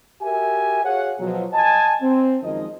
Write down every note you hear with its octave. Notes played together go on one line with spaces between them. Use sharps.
F#4 G4 A#4 E5 G#5
F#4 G#4 C#5 F5 F#5
B2 F3 F#3
D#5 G#5 A5
C4
F#2 D#3 F3 G#3 D#4 D#5